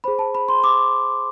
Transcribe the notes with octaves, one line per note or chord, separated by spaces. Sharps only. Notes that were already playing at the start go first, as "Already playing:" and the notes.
G#4 C5 B5
A5
B5
C6
D6